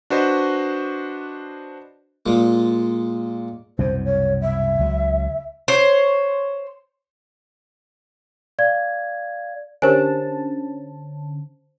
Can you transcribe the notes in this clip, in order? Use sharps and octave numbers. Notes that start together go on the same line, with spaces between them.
D4 F#4 B4 C5 D#5
A#2 G#3
C2 F#2 B2 C5
C#5
E5
C#2 F#3
C5 C#5
D5 F5 G#6
D3 C#4 G4 A#4 C5 G#5 A5